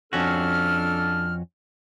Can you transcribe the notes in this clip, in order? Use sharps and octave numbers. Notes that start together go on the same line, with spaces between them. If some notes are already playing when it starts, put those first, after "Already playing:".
F2 C#4 D4 F#4 A4 F6